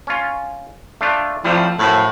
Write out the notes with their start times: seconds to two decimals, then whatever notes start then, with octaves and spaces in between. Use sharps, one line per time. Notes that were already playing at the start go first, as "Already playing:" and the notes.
0.07 C#4 F4
1.01 A3 D4 F4
1.44 A2 C3 F3 G3
1.79 F#2 A2 F3 E4